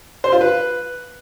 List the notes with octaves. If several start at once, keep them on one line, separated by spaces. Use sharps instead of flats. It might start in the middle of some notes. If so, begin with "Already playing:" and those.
C5
F4
B4